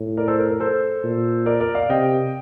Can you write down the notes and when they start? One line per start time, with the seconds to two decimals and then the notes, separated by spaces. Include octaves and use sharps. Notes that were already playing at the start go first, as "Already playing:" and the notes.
Already playing: A2
0.17 A#4 D5
0.28 A4 C5
0.39 A#4
0.50 A#4
0.60 A4 C5
1.04 A#2
1.46 A#4 D5
1.60 A#4 D5
1.75 D5 F5
1.90 C3 D#5 G5